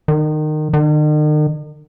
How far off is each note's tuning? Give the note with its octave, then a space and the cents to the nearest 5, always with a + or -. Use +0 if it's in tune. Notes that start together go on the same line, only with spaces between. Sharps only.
D#3 -25
D#3 -45